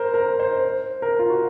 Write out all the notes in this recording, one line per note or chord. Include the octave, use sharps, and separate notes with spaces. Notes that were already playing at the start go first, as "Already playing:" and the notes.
Already playing: A#4 C5
A#4
C5
C5
A#4
F4
F#4